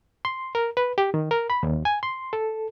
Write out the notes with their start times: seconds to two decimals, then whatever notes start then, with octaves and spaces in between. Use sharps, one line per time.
0.25 C6
0.55 A#4
0.77 B4
0.98 G4
1.14 D#3
1.31 A#4
1.50 B5
1.63 D#2
1.85 G#5
2.03 C6
2.33 A4